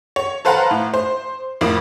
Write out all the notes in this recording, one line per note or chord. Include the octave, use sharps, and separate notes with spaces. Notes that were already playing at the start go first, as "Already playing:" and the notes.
C#5
A4 B4 C5 F5 F#5 A#5
A2
C5
F2 A2 A#3